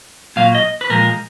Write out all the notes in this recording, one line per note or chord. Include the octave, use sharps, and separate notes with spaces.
A#2 F#3 A#3 F5
D#5
B4
A#2 F3 G#3 A#4